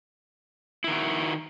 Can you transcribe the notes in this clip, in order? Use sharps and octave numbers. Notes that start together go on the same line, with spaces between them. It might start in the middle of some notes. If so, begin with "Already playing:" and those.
D#3 E4 F#4